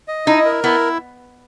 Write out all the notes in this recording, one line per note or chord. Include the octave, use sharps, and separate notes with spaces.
D#5
D#4 E4
A#4
B3 E4